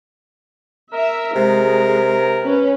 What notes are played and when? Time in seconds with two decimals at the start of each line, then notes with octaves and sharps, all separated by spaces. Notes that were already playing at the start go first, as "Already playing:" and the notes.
0.93 A#4 E5
1.35 C3 G#3
2.41 C#4 B4